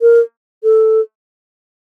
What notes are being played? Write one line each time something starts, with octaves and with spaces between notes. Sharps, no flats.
A#4
A4